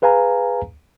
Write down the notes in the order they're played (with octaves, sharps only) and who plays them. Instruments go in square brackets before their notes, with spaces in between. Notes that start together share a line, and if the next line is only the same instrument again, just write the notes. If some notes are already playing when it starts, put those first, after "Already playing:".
[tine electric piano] G#4 B4 F5 G#5 A#5